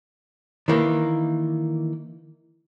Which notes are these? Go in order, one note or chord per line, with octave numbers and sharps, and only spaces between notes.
D#3 E3 A#3